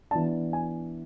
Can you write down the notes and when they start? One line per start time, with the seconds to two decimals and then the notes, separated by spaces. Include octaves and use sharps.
0.11 E3 B3 D4 A5
0.53 G#5